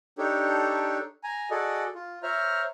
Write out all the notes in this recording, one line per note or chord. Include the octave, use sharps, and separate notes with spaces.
D4 D#4 G4 A4 C#5
G#5 A#5
F#4 G#4 A4 D5 D#5
F4
C5 C#5 E5 A#5 F6